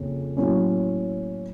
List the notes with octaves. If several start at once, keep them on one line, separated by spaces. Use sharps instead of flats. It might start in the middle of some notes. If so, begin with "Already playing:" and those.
Already playing: F2 C#3 A#3
A2 F#3 A#3 C#4